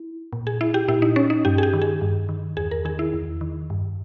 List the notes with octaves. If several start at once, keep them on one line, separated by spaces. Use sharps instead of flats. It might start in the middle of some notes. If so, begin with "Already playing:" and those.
Already playing: E4
A#2
G#4
E4
G4
A#2 E4
D#4
C#4
D#4
G2 G4
G#4
G4
D#3
G#4
G2
D#3
E2 G#4
A#4
D#3 G#4
E4
E2
D#3
G2